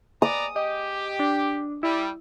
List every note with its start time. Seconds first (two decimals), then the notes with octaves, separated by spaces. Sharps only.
0.22 B3 D5 A#5 D#6
0.56 G4 D#5
1.20 D4
1.83 G3 E4